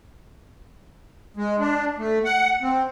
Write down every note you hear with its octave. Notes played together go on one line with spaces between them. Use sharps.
G#3
D4
A3
F#5
C4